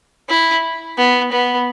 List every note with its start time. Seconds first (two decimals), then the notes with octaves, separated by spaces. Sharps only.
0.29 E4
0.97 B3
1.32 B3